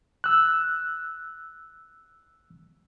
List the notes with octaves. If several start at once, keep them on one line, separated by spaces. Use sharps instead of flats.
E6 F#6